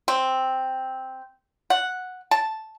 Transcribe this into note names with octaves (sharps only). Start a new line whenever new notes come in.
C4
F#5
A5